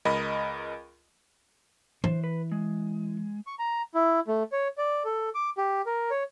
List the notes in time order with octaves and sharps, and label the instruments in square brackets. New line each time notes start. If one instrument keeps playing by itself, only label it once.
[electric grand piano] C#2 A#4 D#5 B5
[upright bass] E3 [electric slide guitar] C5
[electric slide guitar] B4
G#3
[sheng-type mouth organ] C#6
A#5
E4
A3
C#5
D5
A4
D6
G4
A#4
C#5